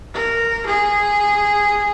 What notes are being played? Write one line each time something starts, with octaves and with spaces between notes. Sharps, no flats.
A#4
G#4